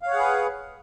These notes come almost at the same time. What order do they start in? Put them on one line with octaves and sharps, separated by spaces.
F5 C#5 F#5 G#4 B4